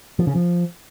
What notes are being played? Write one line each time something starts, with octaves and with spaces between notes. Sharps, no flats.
F3
C#3
F3